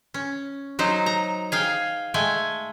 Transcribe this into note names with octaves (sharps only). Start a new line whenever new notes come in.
C#4
F#3 D#4 C5
A#5
G#4 F5 G5
G#3 A3 G5 G#5